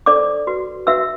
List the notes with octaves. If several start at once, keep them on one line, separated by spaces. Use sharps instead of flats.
D4 A4 C5 D5 D6
F#4 B4
D4 F#4 B4 E5 E6